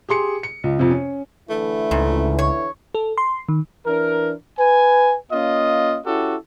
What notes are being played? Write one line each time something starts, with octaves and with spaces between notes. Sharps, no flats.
G4 G#4 C6 C#7
C#7
C#2
F2 C3
C#4
D3 E3 A3 E4
C#2 G#2
C#5
A4
C6
D#3
E3 D4 A#4
B4 G#5
A#3 C#4 F4 D#5
C#4 E4 F#4 G4 A4